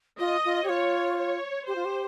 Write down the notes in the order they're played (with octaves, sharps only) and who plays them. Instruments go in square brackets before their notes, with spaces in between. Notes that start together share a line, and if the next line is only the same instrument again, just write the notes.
[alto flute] F4 [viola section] D#5
[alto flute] F4
G4
[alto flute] F4 [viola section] C#5
[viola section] C#5
[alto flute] G4 [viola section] C5
[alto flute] F4
G4